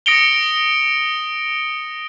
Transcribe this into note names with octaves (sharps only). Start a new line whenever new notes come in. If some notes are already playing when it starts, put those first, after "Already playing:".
D#6 A#6 C#7 D7 F7 G7